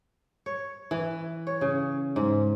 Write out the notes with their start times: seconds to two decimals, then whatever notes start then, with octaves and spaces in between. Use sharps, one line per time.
0.46 C#5
0.91 E3
1.47 C#5
1.61 C#3
2.16 G#2